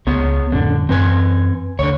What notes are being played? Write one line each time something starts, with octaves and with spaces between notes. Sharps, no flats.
C#2 B3 G#4 C#5
F2 A2 D3 C#4 D4
F#2 E3 C4 B4 G#5
D2 D3 C#5